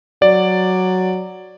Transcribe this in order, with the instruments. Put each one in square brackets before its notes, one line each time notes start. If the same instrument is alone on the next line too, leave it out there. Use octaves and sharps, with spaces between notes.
[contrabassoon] F#3 [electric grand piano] D5